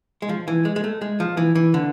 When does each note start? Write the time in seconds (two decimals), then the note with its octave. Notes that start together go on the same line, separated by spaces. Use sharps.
0.22 G#3
0.29 F3
0.48 E3
0.65 G#3
0.76 G#3
0.84 A3
1.01 G#3
1.20 F3
1.37 E3
1.55 E3
1.74 D3